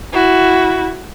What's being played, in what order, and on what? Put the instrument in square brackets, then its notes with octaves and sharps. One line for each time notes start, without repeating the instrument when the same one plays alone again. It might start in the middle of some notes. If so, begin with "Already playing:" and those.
[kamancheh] E4 F#4